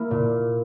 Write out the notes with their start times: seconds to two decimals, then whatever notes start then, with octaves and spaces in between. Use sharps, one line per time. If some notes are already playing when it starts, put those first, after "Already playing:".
Already playing: A#3 E4
0.11 A#2